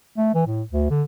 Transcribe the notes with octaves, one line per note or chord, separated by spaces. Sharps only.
A3
E3
A2
D2
D3